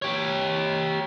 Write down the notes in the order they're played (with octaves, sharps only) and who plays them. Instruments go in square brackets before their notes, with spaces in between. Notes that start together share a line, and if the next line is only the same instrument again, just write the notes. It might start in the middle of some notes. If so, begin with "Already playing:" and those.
[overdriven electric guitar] G4 C#5